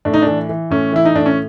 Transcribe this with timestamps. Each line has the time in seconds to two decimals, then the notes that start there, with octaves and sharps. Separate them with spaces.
0.05 A2 D4
0.14 D#4
0.22 E3 D4
0.49 E3
0.70 A2 C#4
0.92 E3 E4
1.05 D#4
1.15 A2 D4
1.26 C#4